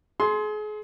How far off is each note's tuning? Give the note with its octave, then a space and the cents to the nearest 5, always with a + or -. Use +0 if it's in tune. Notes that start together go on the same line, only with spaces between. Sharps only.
G#4 +35 C6 +0